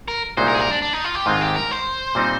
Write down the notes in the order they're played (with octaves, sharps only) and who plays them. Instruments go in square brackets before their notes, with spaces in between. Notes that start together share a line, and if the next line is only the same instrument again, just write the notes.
[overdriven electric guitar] A#4
[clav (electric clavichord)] C2 A#2 G#3 D#4 [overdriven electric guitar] C5
[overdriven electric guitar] A#4
G#4
A#4
D4
D4
D#4
F4
G4
[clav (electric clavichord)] G#2 D#3 G#3 C4 [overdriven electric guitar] F4
[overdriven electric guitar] G4
A#4
C5
[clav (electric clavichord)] A#2 G3 C4 D#4